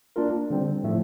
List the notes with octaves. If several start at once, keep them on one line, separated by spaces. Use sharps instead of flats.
A#3 D4 F4 A#4
D3 G3 C4
A2 F3 A3